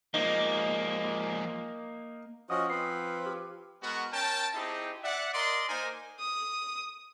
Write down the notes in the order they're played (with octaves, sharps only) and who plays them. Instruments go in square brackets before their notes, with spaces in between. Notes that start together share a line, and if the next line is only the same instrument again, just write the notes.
[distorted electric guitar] F3 G#3 [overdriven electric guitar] A#3 [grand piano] D#4
[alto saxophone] F3 [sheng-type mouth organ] C#4 F#4 D#5 [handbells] D#6
[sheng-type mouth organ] C4 B4 [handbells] C7
[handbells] G4
[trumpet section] G#3 B3 F#4 A#4
C#4 A#4 G5 A5
C4 D#4 E4 G4 G#4
D5 E5 F#5
A#4 D5 D#5 C6
A#3 D#4 A#4 C5 G#5
[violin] D#6